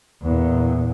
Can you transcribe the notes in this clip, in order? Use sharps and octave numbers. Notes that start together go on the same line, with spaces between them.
E2 A#2